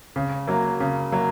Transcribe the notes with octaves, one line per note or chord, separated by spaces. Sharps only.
C#3
F#3 A#3
C#3
F#3 A#3